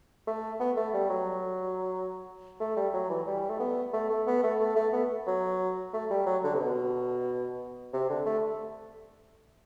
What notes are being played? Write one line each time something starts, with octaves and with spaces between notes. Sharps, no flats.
A3
B3
A3
G3
F#3
A3
G3
F#3
E3
G3
A3
B3
A3
A3
B3
A3
A3
A3
B3
F#3
A3
G3
F#3
D3
C3
B2
C3
D3
A3